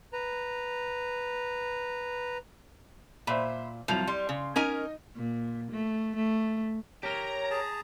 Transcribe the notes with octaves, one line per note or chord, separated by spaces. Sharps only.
B4 A#5
A#2 C5 E5 B5
C2 F3 F#3 F7
G3 C6
C#3
C#4 D#4 A#4 D#5 G#5
A#2
A3
A3
G4 A#4 C#5 A#5
G#4 A5